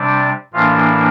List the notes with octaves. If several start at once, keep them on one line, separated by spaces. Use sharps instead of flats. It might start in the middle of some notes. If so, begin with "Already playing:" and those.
Already playing: C3 G3 D4 D5
A2 E3 A#3 D4 F4